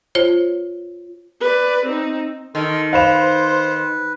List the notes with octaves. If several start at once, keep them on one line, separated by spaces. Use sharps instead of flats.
F4 C5 C#5
B4 D5
C4 D#4
D#3 A4 C6 F6
B4 C5 F5 B5 E7